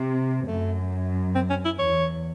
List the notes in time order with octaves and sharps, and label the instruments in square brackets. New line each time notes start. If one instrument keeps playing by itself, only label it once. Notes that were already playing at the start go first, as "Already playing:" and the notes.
Already playing: [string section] C3
[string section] F#2 [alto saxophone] A3
[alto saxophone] C4
C#4
E4
[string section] E2 [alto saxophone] C#5